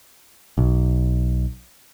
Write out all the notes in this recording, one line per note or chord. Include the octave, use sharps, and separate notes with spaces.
B1